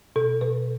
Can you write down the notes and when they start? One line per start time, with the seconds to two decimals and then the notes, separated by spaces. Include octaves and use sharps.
0.16 B2 A4
0.41 B2 B4